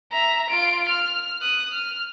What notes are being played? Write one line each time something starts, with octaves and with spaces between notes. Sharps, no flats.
E5 A#5
F4 D7
F6
D#6 F#6
F6